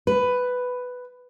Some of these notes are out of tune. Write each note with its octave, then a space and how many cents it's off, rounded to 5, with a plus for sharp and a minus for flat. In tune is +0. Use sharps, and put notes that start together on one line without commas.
B4 +10